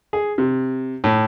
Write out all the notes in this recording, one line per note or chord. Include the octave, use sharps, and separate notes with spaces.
G#4
C3
A2